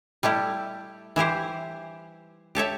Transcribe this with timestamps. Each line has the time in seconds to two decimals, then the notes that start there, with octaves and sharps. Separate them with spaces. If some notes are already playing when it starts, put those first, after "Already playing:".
0.23 G3 A3 E4 G4
1.16 E3 E4 G4 C5
2.55 G4 A4 C#5 E5